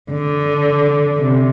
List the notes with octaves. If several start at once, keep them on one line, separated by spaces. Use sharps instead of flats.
D3
C3